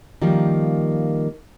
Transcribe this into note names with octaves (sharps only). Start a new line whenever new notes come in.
D#3 F3 G3 A#3